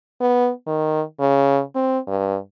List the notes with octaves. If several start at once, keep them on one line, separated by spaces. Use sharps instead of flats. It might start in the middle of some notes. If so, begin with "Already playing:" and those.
B3
D#3
C#3
C4
G2